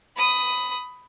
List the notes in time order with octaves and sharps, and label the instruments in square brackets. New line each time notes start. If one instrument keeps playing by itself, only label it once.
[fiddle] B5 D#6